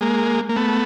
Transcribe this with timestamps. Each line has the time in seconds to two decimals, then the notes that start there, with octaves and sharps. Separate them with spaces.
0.01 G#3 A#3
0.49 A#3
0.56 A3 B3